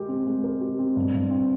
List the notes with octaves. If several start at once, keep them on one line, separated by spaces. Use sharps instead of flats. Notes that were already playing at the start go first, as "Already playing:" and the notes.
Already playing: G#3 G4 A#4
C4
G#3
A#4
G4
C4
G2
G2
C4